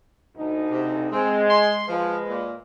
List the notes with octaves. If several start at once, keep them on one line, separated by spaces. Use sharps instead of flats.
D2 B2 D#4
C3
G#3 C4
C6
F3 G#3 B4
A#2